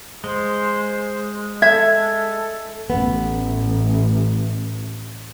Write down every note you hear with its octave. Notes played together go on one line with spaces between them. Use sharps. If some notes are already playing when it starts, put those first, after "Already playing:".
G#3 C5
A4 E5 G#6
A1 B3